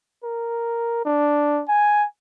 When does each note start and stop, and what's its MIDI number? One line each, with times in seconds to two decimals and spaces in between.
0.24 1.03 70
1.05 1.63 62
1.68 2.05 80